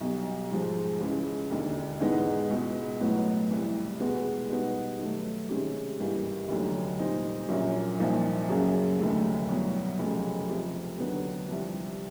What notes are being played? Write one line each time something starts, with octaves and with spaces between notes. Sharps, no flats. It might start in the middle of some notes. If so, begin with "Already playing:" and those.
B1 B2 G3
G#2 F3 G#3
C#2 C#3 E3
E1 D#2 D3
G#2 E3 G#3 B3 D#4
C#2 B2 G#3
A1 A2 F#3 B3
C2 C3 E3
E2 B2 G#3 B3
B2 G3 B3 D#4
D#3 F#3 A3
C3 D#3 G#3 C#4
G#1 G2 E3 G3 A#3
F1 D#2 D3 F#3
A#2 G3 C4 D#4
A#1 A#2 F#3 A#3 C#4
C2 A#2 F3 A#3 D#4
F#2 C#3 F#3 A#3
F1 D#2 D3 F#3 A3
C2 B2 F#3
F1 F2 C#3 F#3
F2 C3 F3
D#2 D3 F#3 B3 D4
C2 C3 F3